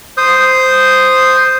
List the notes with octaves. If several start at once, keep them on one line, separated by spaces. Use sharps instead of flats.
C5 D#6